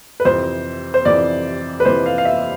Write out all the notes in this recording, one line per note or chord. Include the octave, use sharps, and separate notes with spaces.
B4
F2 C3 E3 C5
C5
F2 C3 E3 D5
B4
F2 C3 E3 C5
F5
F5
E5